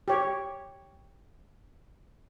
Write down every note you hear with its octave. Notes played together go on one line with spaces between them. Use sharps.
G4 C#5